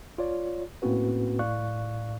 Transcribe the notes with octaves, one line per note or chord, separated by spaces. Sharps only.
F4 C#5 D5
A2 A#3 C4 C#4 F#4 B4
A2 D5 F5 C#6 F#6